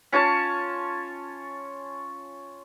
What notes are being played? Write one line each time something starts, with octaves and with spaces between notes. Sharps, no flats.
C#4 F4 C#5 A5